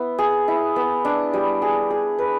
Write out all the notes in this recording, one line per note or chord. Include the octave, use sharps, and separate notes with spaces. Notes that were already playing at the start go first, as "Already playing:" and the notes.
Already playing: B3 E4
G#4
E4
B3
D4
G3
G#4
G#4
B4